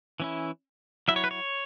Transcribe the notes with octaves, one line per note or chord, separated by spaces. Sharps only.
E3 C#4 E4
F#3 E4 E5
C#5
B4
C#5